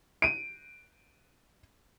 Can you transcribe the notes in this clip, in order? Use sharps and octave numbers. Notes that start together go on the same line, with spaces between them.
D7 D#7